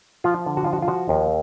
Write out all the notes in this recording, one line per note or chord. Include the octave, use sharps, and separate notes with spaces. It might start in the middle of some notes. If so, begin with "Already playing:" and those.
F3 F4
D3
F#4
F3 F4
F#4
F4
F3 F#4
D#2